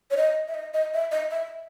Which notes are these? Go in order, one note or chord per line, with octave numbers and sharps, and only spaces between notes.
C#5
D#5
E5
D#5
D#5
E5
D#5
E5